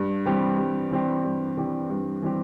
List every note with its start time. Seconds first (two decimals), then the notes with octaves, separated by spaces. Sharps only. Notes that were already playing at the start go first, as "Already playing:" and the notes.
Already playing: G2
0.26 E3 G3 C4 G4
0.58 G2
0.91 E3 G3 C4 G4
1.23 G2
1.57 E3 G3 C4 G4
1.90 G2
2.23 E3 G3 C4 G4